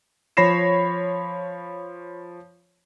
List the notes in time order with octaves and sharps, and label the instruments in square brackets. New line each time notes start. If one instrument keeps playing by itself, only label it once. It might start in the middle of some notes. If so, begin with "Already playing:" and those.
[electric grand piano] F3 C#5 B5 A#6 C7 E7